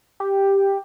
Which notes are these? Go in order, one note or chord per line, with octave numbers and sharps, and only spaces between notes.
G4